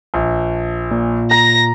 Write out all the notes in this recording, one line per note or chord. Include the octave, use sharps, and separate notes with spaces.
A#1
A#2
A#5 A#6